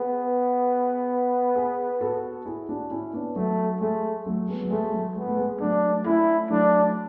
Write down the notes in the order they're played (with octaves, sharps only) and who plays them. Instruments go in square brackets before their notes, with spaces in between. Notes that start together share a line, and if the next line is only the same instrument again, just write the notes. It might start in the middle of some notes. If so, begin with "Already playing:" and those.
Already playing: [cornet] B3 [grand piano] G#4 B4
[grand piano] G#4 B4
F#4 A4
E4 G#4
D4 F#4
C#4 E4
B3 D4
[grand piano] F#3 [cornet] A3
[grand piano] G#3 [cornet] A3
[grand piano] F#3 A3
G#3 B3
F#3
[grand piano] G#3 [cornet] A3
[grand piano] F#3
[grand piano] G#3 [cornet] B3
[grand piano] A3
G#3
[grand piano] F#3 A3 [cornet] D4
[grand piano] A3 C#4 [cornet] E4
[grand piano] F#3 A3 [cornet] D4